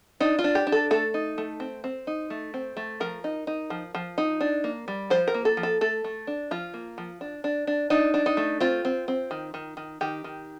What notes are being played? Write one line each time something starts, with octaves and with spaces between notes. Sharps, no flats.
D4 D#4
F4
D4
G4
D4
A4
A3 A4
D#4
A3
C4
C4
D#4
A3
C4
A3
F3 A#4
D#4
D#4
F3
F3
D#4
D4
A#3
G3
F3 C5
A#4
A#3
A4
F3
A4
A3 A4
A3
D4
F3 F4
A#3
F3
D4
D4
D4
D4 D#4
D4
D#4
A3
C4 F4
C4
C4
D#3
D#3
D#3
D#3 G4
D#3